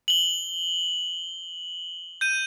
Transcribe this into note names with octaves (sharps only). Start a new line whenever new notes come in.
F#7 G7
G6 D#7